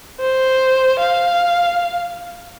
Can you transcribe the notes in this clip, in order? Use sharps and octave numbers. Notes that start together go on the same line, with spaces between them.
C5
F5